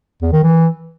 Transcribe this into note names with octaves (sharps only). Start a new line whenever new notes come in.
E2
D#3
E3